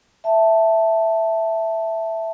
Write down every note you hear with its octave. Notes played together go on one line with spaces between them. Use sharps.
E5 A5